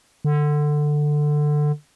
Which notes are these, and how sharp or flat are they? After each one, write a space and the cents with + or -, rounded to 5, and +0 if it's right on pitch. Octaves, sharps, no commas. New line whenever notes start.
D3 +15